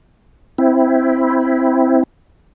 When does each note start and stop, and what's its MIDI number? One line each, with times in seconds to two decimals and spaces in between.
0.58 2.03 60
0.58 2.03 64